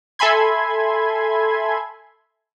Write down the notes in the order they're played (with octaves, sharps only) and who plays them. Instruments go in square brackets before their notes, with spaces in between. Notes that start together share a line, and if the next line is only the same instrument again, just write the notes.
[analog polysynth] A4 E5 G#5 B5 C6 G#6